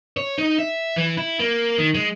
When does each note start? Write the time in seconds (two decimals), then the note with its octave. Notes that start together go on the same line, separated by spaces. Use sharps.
0.17 C#5
0.38 D#4
0.58 E5
0.96 E3
1.17 E4
1.39 A#3
1.78 D#3
1.95 G#3